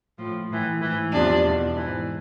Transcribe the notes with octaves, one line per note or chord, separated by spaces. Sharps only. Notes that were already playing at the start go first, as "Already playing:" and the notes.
A2 F3
A2 E3
G#2 E3
E2 C3 F3 D4
E2 B2
G#2 E3